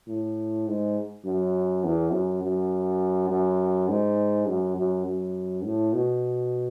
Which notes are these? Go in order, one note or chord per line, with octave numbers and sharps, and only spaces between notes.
A2
G#2
F#2
E2
F#2
F#2
F#2
G#2
F#2
F#2
F#2
A2
B2